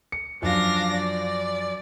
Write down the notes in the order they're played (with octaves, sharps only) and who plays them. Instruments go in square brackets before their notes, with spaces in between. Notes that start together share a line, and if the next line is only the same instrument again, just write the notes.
[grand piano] C#7
[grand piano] F#2 F3 [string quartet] D4 F5 A#6
[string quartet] D5